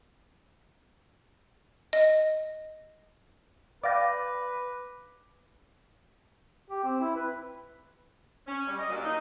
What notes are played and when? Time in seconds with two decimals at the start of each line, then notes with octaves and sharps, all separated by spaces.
1.93 D#5
3.83 B4 D5 F5 G5 D6 A#6
6.70 G4
6.84 C4
7.00 E4
7.16 B4
8.47 C#4
8.67 G3
8.79 D#5
8.90 A#2 F#3 D4 G4 A#4
9.04 D#4